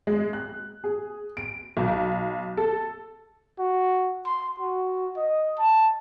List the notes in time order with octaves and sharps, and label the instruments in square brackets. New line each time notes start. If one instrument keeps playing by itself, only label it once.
[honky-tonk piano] G#3
F#6
G#4
D7
B1
A4
[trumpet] F#4
C6
F#4
D#5
A5